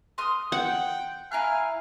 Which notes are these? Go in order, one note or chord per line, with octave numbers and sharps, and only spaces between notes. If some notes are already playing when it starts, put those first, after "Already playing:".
C6 D#6 F6
F#5 G5
E4 F5 G#5 A#5 F#6